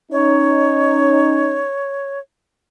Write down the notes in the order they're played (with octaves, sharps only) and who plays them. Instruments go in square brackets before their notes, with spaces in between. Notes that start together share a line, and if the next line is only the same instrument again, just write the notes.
[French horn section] C#4 D#4 [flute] C#5